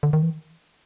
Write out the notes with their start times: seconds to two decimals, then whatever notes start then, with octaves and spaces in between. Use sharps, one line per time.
0.03 D3
0.13 D#3
0.23 E3